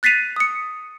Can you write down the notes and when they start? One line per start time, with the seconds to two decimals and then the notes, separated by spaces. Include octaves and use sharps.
0.03 F#6 A6 B6 C7 D#7 F7
0.36 D#6 C#7